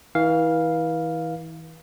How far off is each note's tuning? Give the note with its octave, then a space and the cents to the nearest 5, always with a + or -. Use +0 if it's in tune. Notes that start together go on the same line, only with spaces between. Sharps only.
E3 -35 F5 +0